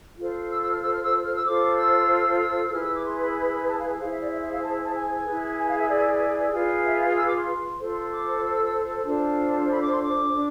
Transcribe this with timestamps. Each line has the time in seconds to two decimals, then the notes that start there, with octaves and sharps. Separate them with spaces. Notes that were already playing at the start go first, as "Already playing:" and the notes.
0.18 F4 A4 C5
0.50 E6
0.61 E6
0.71 F6
0.81 E6
0.92 F6
1.02 E6
1.24 F6
1.34 E6
1.45 F4 A4 C5 D6
1.77 E6
2.40 E6
2.67 E6
2.72 E4 G#4 B4 F6
2.83 E6
2.94 D6
3.04 C6
3.20 B5
3.67 A5
3.78 F5
3.88 G#5
3.99 E4 G#4 C5 F5
4.09 E5
4.20 D5
4.30 E5
4.41 E5
4.51 F5
4.62 A5
4.84 A5
4.94 G#5
5.26 E4 G#4 B4
5.58 G#5
5.68 F5
5.78 E5
5.89 D5
6.52 F4 G#4 B4
6.84 E5
7.00 F5
7.16 E6
7.27 D6
7.37 C6
7.79 F4 A4 C5
8.11 D6
8.43 E6
8.53 E6
8.64 E6
9.06 D4 F4 A4 C5 A5
9.70 B5
9.81 D6
9.90 C6
10.01 D6
10.34 D4